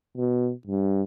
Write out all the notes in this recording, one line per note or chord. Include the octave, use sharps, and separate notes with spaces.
B2
G2